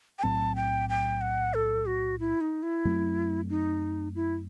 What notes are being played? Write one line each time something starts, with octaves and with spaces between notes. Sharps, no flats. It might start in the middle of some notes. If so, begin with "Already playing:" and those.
G5
B1 A2 F#3 C4 A5
G5
G5
F#5
A4
F#4
E4
D#4
E4
F#2 F#3 A3 C4
D#4
E4